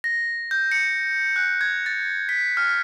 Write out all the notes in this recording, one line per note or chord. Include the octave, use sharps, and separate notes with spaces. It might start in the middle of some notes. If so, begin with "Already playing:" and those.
A#6
G6
C#7
F#6
G#6
A6
B6
F6